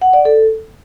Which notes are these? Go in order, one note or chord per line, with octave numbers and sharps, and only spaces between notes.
F#5
D5
A4